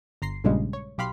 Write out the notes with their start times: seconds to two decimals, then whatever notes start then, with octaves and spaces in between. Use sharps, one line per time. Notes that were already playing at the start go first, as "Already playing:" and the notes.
0.22 G1 A#5 C6 C7
0.44 A#1 G2 A#2 C#3 G3 G#3
0.73 C#5
0.98 B1 G4 F5 B5 C6